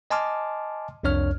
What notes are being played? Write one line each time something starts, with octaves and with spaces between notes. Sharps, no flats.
D#5 G#5 A5 C6 D6 F6
C2 F2 D4 C#5 F6